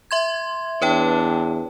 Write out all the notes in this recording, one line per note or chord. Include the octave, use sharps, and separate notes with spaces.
E5 C6 G#6
E2 D4 B4 C#5 G5